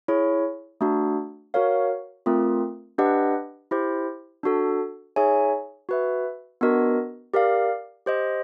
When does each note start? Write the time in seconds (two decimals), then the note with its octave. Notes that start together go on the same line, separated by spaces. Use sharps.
0.08 E4 G#4 C#5
0.81 A3 D4 F#4
1.54 F#4 A#4 C#5 F5
2.26 A3 C4 F4 A#4
2.98 D4 G4 B4 D#5 F#5
3.71 E4 G4 C5
4.43 D4 F#4 A4
5.16 D#4 G#4 C#5 E5 G#5
5.89 F#4 B4 E5
6.61 B3 D4 F#4 A#4 D#5
7.34 G4 A#4 D5 F5
8.06 G4 C5 D#5